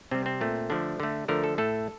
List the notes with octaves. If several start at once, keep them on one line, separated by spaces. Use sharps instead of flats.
C3 G3 C4
C4
A#2 A3
D3 F3 A3 D4
D3 A3
D3 F3 A3 A#4
A4
A2 A3 A4